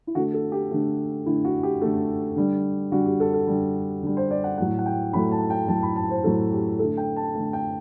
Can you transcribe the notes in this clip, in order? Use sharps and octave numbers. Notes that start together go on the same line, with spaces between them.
E4
D3 A3 F#4
A4
G4
D3 A3
D3 A3 E4
F#4
G4
D3 A3 A4
D3 G3
D3 G3 F#4
G4
A4
A4
D3 G3
D3 G3
C5
D5
F#5
A2 F#3 A3 F#5
F#5
G5
A2 F#3 A3 B5
A5
G5
A2 F#3 A3 A5
B5
A5
C5
A2 F#3 A3 A4
G4
D3 A3 A4
G5
A5
D3 A3
G5